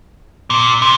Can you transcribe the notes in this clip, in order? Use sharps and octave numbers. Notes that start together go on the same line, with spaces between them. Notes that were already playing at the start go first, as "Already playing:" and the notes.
A#2
C3